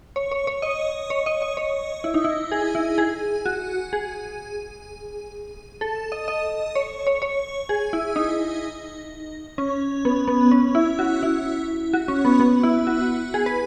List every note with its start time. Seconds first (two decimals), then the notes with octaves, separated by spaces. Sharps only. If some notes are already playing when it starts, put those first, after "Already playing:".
0.16 C#5
0.32 C#5
0.47 C#5
0.62 D#5
1.10 C#5
1.26 D#5
1.42 D#5
1.57 C#5
2.04 E4
2.14 D#4
2.25 E4
2.52 G#4
2.75 E4
2.98 G#4
3.46 F#4
3.93 G#4
5.81 A4
6.12 D#5
6.28 D#5
6.75 C#5
7.07 C#5
7.22 C#5
7.69 G#4
7.93 E4
8.16 D#4
9.58 C#4
10.05 B3
10.28 B3
10.52 C#4
10.75 E4
10.99 F#4
11.23 E4
11.93 F#4
12.08 C#4
12.25 B3
12.40 B3
12.63 E4
12.87 F#4
13.34 G#4
13.46 B4